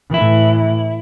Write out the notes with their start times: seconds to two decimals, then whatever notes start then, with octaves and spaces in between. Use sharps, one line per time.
0.14 A2 E3 E4